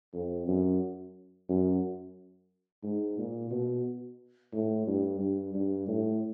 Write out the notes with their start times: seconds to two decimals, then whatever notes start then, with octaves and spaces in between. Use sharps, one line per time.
0.14 F2
0.48 F#2
1.49 F#2
2.83 G#2
3.18 A#2
3.51 B2
4.53 A2
4.87 G2
5.19 G2
5.54 G2
5.88 A2